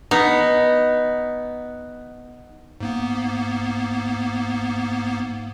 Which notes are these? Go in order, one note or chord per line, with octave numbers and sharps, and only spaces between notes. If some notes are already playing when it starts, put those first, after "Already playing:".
B3 D#4
G#2 A#3 B3